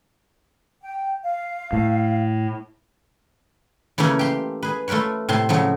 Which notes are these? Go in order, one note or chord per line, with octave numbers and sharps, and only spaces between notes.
G5
F5
A2
C#3 E3 A3 A#3 C#4
G4 C6
G#4 B4
A3 F4 A#4 B4 C#5
A2 C3 A5 C6
C#3 F3 F#3 A3